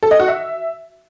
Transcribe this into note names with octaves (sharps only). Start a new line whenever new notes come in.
A4
D#5
F#4
E5